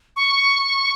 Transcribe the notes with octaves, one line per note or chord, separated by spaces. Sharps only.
C#6